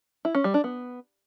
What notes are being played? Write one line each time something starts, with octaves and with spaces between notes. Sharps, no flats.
E4
C#4
G3
D4
B3